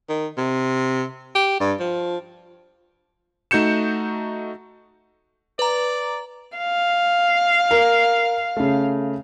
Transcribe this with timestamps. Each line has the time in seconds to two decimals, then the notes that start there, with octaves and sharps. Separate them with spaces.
0.09 D#3
0.37 C3
1.35 G4
1.60 G2
1.80 F3
3.51 A3 D#4 F#4 G6 C#7 E7
5.59 B4 D5 A#5
6.58 F5
7.71 A#4
8.57 C#3 A3